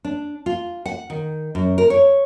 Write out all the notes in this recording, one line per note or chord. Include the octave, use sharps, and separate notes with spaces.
D4
F4
F#5
D#3
F#2
A#4
C#5